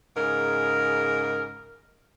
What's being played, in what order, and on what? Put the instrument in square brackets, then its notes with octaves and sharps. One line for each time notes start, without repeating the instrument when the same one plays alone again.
[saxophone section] G#2 C#3 A#4